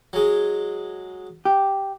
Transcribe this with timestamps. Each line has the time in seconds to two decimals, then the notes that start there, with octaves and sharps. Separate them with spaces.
0.13 F#3 G#3
1.45 G4